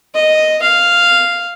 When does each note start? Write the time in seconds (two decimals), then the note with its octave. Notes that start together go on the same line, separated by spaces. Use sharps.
0.15 D#5
0.62 F5